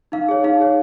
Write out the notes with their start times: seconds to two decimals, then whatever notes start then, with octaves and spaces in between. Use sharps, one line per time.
0.12 D#4 F5
0.29 G#4 C#5
0.44 D#4 F5
0.60 G#4 C#5